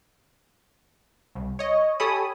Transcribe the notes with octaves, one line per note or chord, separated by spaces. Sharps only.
C2
C#5 D#5
G4 A4 C#5 G#5 B5 D#6